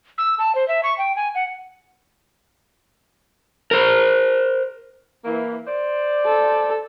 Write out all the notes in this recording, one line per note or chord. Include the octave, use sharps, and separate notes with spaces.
E6
A5
C5
E5
C#6
G5
G#5
F#5
A#4 C5
E3 A#3
C5 D5
A4